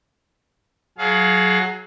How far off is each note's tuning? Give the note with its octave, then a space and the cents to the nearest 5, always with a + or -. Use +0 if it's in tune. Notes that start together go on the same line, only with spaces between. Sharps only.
F#3 +0 G#4 +35 F5 +0